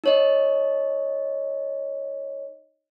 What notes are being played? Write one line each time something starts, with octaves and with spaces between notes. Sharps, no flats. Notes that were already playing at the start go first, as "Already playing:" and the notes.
D#4 C#5 D#5